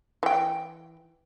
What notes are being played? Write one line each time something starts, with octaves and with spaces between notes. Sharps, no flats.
E3 G5